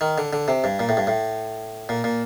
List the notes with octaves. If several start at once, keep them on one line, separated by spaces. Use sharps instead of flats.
D#3
D3
D3
C3
G2
A#2
A2
G2
A2
A#2
A#2